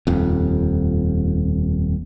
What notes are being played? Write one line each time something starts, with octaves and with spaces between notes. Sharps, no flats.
D#1 F2